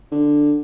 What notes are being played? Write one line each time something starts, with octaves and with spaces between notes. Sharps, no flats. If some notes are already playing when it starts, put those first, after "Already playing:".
D3